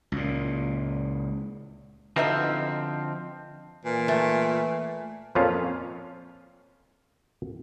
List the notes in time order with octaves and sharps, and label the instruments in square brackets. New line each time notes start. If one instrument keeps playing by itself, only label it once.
[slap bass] C#2 A#2
[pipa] B2 D#4 E5 [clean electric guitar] D3 F3 C4
[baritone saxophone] A#2 [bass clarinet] E3
[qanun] A3
[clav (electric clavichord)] F2 A#2 F3 C#4 F4 F5